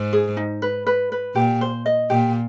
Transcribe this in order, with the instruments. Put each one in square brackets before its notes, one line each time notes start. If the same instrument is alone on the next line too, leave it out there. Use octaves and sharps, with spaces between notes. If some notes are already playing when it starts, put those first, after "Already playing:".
Already playing: [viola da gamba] G#2
[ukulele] G#4
D#4
B4
B4
B4
[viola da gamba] A#2 [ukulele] G4
[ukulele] C5
D#5
[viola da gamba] A#2 [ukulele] G4